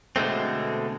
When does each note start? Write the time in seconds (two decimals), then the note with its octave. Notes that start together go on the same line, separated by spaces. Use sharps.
0.16 B2 D3 G#3 A3 C4